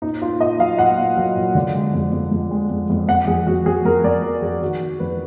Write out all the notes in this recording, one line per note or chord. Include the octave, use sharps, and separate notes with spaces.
A#2 D#4
A#2 F4
A#2 D#5
F#3 F5
A#2 F#5
A#2
F#3
A#2
D3
G#3
F2
F2
F2
G#3
F2
F2
F2 F#5
F2 G#4
F2 F#4
F2 G#4
F2 A#4
F2 D5
A#3 A#4
F2 G#4
D#3 F#4
D#3
F2 B4